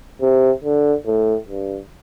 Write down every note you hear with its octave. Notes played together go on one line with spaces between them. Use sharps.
C3
D3
A2
G2